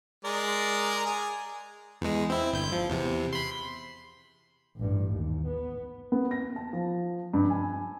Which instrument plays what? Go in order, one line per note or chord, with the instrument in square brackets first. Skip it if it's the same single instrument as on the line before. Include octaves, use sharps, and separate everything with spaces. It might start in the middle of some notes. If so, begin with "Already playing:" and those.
[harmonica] G#3 A#4 D5
G#4
[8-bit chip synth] E2 G#3
C4 E4
G1 G6
F3
E2 C3
B5 C6
[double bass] A1 G2
D#2
B3
[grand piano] B3
A#6
A5
F3
G2
G#5